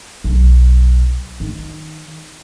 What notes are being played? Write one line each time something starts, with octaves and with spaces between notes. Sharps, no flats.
B1
D#3